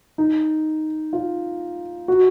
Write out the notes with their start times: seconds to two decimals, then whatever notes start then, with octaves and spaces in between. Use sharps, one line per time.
0.18 D#4
1.13 F4
2.08 F#4